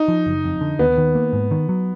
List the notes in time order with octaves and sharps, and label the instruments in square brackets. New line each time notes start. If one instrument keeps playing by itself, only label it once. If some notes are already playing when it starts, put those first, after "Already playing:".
Already playing: [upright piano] D#4
[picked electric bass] F3
F#1
F2
D3
[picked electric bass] D#2 [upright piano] B3
[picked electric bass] D#3
A#3
G#2
D#3
F#3